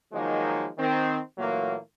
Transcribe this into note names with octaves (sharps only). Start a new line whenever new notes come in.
D#3 F3 F#3 G#3 A#3 D#4
D#3 C4
A#2 E3 F#3 A3 A#3